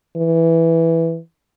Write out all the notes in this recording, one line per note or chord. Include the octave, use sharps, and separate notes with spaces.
E3